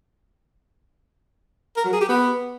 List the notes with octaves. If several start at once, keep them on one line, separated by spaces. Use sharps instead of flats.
A#4
F#3
G#4
G4
B3